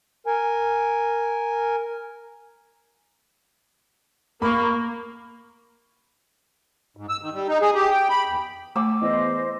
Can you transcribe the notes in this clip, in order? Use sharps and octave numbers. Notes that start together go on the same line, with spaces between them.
A#4 G#5
A#3 B5 C#6
G#2
E6
D#3
G3
D#4
G#4
G4
G5
B5
E2
A3 G#5 D6 E6
E2 C5 D#5